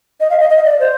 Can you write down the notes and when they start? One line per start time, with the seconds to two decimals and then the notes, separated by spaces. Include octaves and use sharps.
0.20 D#5
0.30 F5
0.40 D#5
0.50 D#5
0.65 D5
0.80 C5